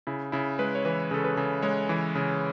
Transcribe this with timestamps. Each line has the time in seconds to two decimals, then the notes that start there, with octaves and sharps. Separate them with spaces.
0.07 C#3 E4
0.32 C#3 E4
0.59 G#3 B4
0.75 C#5
0.85 E3 B4
1.11 C#3 A4
1.24 B4
1.37 C#3
1.62 G#3 C#5
1.89 E3
2.15 C#3